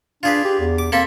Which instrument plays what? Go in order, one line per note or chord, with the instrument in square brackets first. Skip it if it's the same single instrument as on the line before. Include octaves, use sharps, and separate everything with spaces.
[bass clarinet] D4 [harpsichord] F4 G#4 B4
[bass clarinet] G4
E2
[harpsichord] D6
[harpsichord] A#3 A4 B5 [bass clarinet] C4